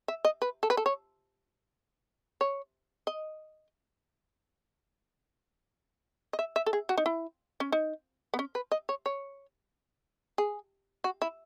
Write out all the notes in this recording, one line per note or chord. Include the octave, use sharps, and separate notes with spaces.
E5
D#5
B4
A4
B4
A4
C#5
C#5
D#5
D#5
E5
E5
A4
G#4
F#4
D#4
E4
C#4
D#4
B3
C#4
B4
D#5
C#5
C#5
G#4
F#4
E4